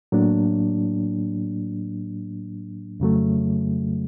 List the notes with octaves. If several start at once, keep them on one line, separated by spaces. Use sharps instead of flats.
A2 F#3 A#3 D4
F2 C#3 F#3 A3